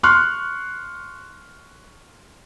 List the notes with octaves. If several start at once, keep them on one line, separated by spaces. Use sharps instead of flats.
C6 C#6 F6 F#6